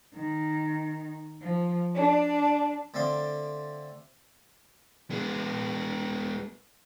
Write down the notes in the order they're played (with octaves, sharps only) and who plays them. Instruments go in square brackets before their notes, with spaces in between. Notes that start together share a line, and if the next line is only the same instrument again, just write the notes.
[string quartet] D#3
F3
D4
[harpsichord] D3 A3 C4 D5 F5 C6
[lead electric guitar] G#3 B3